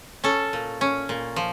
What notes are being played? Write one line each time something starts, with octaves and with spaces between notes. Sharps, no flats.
C#4 A4
A#2
C#4
A#2
F3